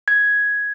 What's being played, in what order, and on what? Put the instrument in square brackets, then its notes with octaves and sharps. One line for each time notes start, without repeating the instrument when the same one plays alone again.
[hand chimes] G#6